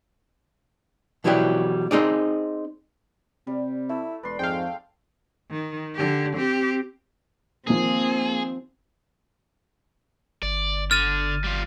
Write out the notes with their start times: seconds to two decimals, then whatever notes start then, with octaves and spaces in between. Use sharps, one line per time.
1.24 B2 E3 F#3 G3 E4 G4
1.91 C4 D#4 G#4 D5
3.47 C3 G3
3.89 A3 E4
4.23 E1 B4 D5 C6
4.39 F2 G#2 G#3 A3 F5 G5
5.50 D#3
5.95 D3 G4
6.36 C4 G4
7.67 D#2 D#3 F3 A#3 C4 G#4
10.43 G1 D5
10.91 D3 F6 A6 D#7
11.44 G3 F4